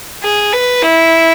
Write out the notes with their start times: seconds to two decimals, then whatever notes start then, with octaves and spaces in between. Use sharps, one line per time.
0.23 G#4
0.53 B4
0.82 E4